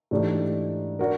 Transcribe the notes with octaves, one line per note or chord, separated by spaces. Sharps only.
G#2 E3 A3 D4 G4
D4 F#4 A#4